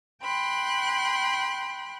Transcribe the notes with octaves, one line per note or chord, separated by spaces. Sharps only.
G5 B5 C6 F#6